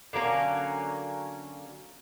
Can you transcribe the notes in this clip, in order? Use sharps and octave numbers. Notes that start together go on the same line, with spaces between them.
D3 F#3 A#3 C#4